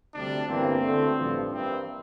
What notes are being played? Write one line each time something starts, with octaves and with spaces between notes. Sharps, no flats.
D2 C3 G3 D4
G1 G2 E3 A#3 C4
D2 D3 A3
A1 G2 F3
G2 E3 A#3 C4